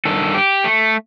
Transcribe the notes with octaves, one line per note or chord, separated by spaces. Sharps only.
G2 D#3 A4
G4
A3